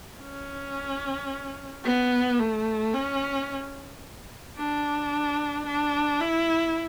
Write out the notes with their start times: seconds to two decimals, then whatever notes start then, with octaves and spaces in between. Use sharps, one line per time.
0.21 C#4
1.85 B3
2.39 A3
2.94 C#4
4.57 D4
5.66 D4
6.21 E4